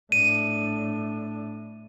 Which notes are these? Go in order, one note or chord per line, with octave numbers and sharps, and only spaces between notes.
A2 D4 D#7